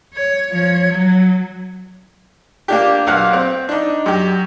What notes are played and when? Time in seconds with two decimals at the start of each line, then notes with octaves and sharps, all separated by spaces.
0.14 C#5
0.51 F3 C#5
0.91 F#3
2.68 A#3 D4 G4
3.07 B1 A#3 F5 F#5
3.33 C4
3.69 D4 D#4
4.06 F#2 G4